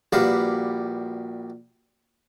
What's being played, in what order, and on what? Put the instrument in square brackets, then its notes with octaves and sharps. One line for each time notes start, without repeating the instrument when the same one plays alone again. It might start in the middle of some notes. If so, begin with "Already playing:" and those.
[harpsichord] A#1 G3 F#4 B4 F5